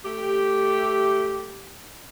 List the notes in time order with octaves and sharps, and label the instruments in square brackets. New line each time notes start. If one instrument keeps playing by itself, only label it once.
[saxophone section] A3 G4